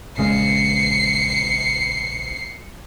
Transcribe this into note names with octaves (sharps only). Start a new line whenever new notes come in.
A#1 C#3 G#3 C7 C#7